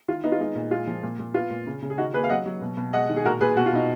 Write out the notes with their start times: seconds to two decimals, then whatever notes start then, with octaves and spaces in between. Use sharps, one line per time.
0.08 D#3 F4
0.24 B3 D#4
0.32 F4
0.39 G#3 D#4
0.55 A#2
0.71 G#3 F4
0.87 F3
1.03 A#2
1.19 A#2
1.34 B3 F4
1.50 A#2
1.67 C#3
1.82 C#3
1.90 G#4
1.98 D#3 D#4 F#4
2.14 A#3 G#4 B4
2.24 F5
2.29 F#3 D#5 F#5
2.46 F#3
2.62 B2
2.77 B2
2.93 G#3 D#5 F#5
3.09 D#3
3.16 G#4
3.25 A#2 F#4 A#4
3.41 A#2 G#4 B4
3.56 B2 F#4
3.66 F4
3.73 B2 D#4